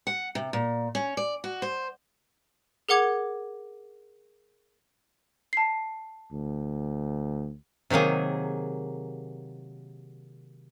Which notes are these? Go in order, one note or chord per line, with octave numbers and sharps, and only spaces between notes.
F#5
C3
A#2
C#4
D5
F#4
C5
G#4 A#4 F#5 D6 G#6
A5 C7
D2
C3 D#3 F#3 A#3 G#4